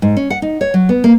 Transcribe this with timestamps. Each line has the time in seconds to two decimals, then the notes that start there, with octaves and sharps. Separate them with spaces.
0.02 G#2
0.17 C#4
0.30 F#5
0.42 D#4
0.61 C#5
0.74 F#3
0.89 B3
1.04 A#3